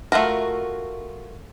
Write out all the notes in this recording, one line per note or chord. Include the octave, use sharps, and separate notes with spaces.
A3 F4 F#4 A#4